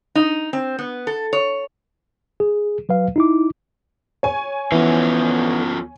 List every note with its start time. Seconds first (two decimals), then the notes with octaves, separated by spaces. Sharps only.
0.15 D#4
0.53 C4
0.79 B3
1.07 A4
1.33 C#5
2.40 G#4
2.89 F#3 B4 F5
3.16 D#4 E4 D6
4.23 C#5 G#5
4.72 D2 E3 F3 B3 C#4